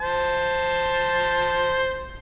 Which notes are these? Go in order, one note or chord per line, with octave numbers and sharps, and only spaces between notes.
C5 A5